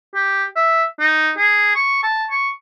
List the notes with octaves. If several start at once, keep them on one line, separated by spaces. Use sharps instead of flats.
G4
E5
D#4
G#4
C#6
A5
C#6